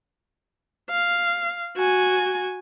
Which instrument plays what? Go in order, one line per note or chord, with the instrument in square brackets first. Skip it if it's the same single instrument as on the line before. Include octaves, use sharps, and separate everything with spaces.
[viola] F5
F#4 G#5